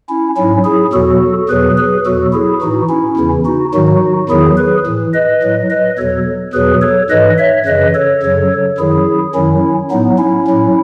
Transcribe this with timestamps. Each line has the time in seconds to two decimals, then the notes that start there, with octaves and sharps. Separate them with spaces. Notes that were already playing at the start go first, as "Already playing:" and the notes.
0.09 C#4 E4
0.36 G#2 F#3 C#4 E4
0.65 E4 G#4
0.93 E2 B2 F#3 F#4 A4
1.49 E2 B2 F#3 G#4 B4
1.78 G#4 B4
2.06 E2 B2 F#3 F#4 A4
2.33 E4 G#4
2.61 A2 E3 D#4 F#4
2.89 C#4 E4
3.17 E2 C#3 E3
3.45 D#4 F#4
3.73 G#2 D#3 F#3 D#4 F#4
4.29 E2 D#3 F#3 E4 G#4
4.57 G#4 B4
4.86 A2 E3
5.13 B4 D#5
5.43 A2 F#3
5.70 B4 D#5
5.98 E2 B2 F#3 A4 C#5
6.54 E2 B2 F#3 G#4 B4
6.82 A4 C#5
7.10 G#2 E3 B4 D#5
7.38 C#5 E5
7.66 F#2 C#3 E3 B4 D#5
7.94 A4 C#5
8.23 F#2 C#3 F#3
8.78 F#2 D#3 F#3 E4 G#4
9.35 F#2 D#3 F#3 C#4 E4
9.90 A2 F#3 B3 D#4
10.18 C#4 E4
10.47 A2 F#3